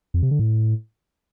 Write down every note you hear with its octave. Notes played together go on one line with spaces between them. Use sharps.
F2
C3
D3
A2